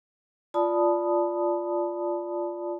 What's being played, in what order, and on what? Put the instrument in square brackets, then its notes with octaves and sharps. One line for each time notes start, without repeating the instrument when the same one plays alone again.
[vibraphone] F4 D5 A5 B5 D#6